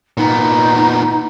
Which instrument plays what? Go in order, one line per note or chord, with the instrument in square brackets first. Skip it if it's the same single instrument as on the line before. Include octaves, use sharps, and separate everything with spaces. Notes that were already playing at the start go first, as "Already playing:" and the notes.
[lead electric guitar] A#2 B3 [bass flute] D#4